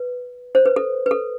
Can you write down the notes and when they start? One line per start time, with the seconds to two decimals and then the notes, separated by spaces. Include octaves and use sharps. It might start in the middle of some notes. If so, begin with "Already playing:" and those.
Already playing: B4
0.55 C5
0.66 B4
0.76 A4
1.06 B4
1.11 A4